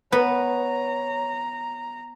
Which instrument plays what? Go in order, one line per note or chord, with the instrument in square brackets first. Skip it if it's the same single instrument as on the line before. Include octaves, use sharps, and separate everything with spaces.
[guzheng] B3 [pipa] B4 [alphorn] C#5 [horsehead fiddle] A#5